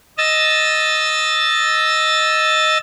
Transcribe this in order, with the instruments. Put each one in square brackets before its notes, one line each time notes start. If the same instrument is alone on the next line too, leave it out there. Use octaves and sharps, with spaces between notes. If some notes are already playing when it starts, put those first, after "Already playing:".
[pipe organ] D#5 E6 A6